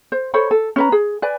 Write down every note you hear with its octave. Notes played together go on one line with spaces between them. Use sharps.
C5
A4 C5 C#5 B5
A4
C#4 B4 A#5
G#4
B4 D5 G#5